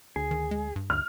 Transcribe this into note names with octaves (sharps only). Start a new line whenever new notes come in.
D2 G#4
D#3
G#3
G2
D2 F6